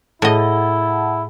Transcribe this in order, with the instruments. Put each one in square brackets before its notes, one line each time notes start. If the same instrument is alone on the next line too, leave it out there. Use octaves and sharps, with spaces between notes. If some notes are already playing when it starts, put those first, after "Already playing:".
[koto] A2 D#5 [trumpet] E4 [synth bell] G#4 F#5 A5